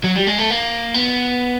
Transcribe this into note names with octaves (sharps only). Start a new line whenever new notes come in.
F#3
G3
G#3
A3
A#3
B3